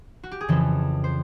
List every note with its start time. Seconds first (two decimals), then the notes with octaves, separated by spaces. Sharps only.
0.23 F#4
0.31 G4
0.41 G#4
0.48 F2 C#3 E3 A4
1.04 C5